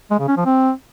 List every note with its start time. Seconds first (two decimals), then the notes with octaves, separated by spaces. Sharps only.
0.11 G#3
0.19 C#3
0.28 C#4
0.37 F3
0.45 C4